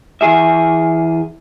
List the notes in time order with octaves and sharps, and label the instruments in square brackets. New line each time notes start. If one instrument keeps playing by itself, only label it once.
[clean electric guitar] E3 G#4 E5